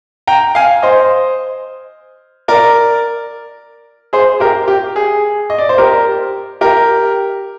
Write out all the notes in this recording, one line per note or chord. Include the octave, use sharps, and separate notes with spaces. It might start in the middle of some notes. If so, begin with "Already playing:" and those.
G5 A#5
F5 G#5
C5 D#5
A#4 D5
G#4 C5
G4 A#4
G4
G#4
D#5
D5
C5
G4 A#4
G4 A#4